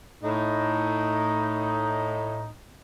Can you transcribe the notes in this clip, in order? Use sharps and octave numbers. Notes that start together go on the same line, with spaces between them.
A2 D#4